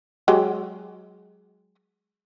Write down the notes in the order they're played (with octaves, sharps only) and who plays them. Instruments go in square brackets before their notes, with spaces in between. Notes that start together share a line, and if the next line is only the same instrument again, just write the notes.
[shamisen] F#3 G#3 G4